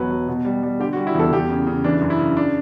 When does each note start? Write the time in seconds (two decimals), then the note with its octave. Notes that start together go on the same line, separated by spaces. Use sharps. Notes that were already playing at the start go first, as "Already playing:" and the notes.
Already playing: E1 B2 F#3 B4
0.10 F#3
0.28 B2
0.45 G3
0.63 G3
0.80 D3 G4
0.93 F#4
0.97 G3
1.07 E4
1.15 E2 A4
1.32 E2 G4
1.50 C#3
1.67 C#3
1.84 E3 D4
2.01 F#2
2.10 E4
2.19 C#3
2.37 D4